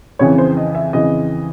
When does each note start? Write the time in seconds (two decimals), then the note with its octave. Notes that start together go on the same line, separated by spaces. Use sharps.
0.19 F2 C#3 E3 C#5
0.38 C5
0.57 D#5
0.75 E5
0.93 F2 C#3 E3 D#5